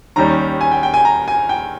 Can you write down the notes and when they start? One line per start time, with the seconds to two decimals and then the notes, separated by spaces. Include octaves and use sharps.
0.16 D#2 D#3 G3 C#4 A#5
0.61 G#5
0.71 G5
0.83 G5
0.94 G#5
1.05 A#5
1.28 G#5
1.49 G5